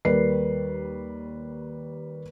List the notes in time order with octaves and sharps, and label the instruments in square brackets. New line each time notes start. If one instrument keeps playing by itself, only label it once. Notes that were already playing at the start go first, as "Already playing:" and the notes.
[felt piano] D#2 G3 A#4 B4 D5 C7